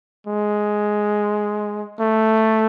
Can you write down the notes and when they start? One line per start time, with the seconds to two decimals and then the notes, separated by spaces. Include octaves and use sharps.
0.27 G#3
2.00 A3